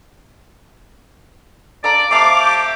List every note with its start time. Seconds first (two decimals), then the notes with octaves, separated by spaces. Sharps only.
1.84 A4 D5 F5 A#5
2.11 C3 A3 F5 D6
2.40 G4